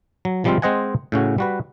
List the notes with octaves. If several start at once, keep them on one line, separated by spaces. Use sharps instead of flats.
F#3
C3 F3 G3 G#3 C4 F4
G#3 C4 C5 D#5 F#5 G#5
A2 C#3 C#4 F#4
G3 F#4 B4